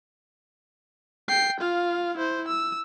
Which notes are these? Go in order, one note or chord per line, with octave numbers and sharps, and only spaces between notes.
G5 C7
F4 F5
E4 C5
E6